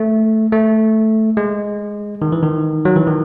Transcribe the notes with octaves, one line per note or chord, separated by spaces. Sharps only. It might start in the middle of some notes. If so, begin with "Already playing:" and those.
Already playing: A3
A3
G#3
D#3
E3
D#3
F#3
E3
D#3